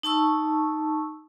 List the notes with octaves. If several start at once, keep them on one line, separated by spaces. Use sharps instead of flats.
D#4 A5 C#6 E6